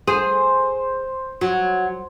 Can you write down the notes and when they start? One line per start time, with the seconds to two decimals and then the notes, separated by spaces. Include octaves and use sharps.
0.07 G#4 C5
1.41 F#3